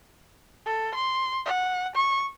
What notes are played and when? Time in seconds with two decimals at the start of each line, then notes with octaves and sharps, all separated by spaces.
0.66 A4
0.95 C6
1.46 F#5
1.96 C#6